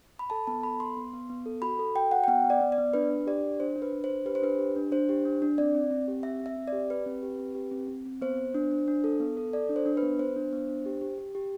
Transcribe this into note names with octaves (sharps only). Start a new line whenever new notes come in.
B5
A4 A5
B3 A5
A4 B5
B3 C6
B3
B3
B3
A4
F#4 B5
A4
F#4 G5
F#4 F#5
G5
B3 F#5
B3
D5
B3
D5
B3
D4 B4
D4
G4 D5
D4
D4 C5
D4
B4
D4
C5
D4
G4 B4
C5
D4 B4
G4
D4
D4 C5
G4
D4
D4
C4 D5
C4
C4
G4
C4 E5
C4
E5
C4
D5
G4
G4 B4
C4
G4
C4
G4
C4
C4
C4
B3 C5
B3
D4
D4
D4
A4
B3
A4
A4 D5
D4
C5
D4
B4
B3
B3 C5
D4
B3
D4
G4
G4
G4
G4